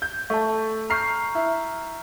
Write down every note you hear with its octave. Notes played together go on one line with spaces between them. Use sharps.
G6
A3 A5 C#6
A#5 C#6 F6 G6 C7
E4